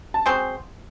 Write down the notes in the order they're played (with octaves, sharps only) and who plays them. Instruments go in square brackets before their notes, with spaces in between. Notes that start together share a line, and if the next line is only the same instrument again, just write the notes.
[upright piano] A5
[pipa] G#3 C4 F#4 C5 [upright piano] G#5